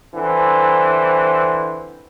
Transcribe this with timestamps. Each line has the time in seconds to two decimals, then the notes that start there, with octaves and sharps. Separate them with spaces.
0.14 D3 E3 C4 C5